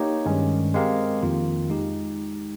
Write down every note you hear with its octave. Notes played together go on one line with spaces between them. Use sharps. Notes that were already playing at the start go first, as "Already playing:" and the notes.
Already playing: A#3 D#4 G4 C#5
G2 D#3 G#3 C#4
G#3 C4 G4 A#4 F5
F2 D#3 A#3 F4
G#3 D#4 G4